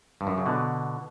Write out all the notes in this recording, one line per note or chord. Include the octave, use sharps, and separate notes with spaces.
G2
F#2
C#3
B2 D3